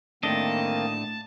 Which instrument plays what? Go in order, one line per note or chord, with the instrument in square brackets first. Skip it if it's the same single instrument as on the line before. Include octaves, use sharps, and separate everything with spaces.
[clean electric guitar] A2 A3 D4 [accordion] D#3 A#3 C4 [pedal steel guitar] D#5 [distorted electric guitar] A5